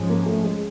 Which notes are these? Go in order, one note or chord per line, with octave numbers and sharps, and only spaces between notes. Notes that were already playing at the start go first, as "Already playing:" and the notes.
Already playing: G#2 F3 G#3 C#4
A#3
A3
G#3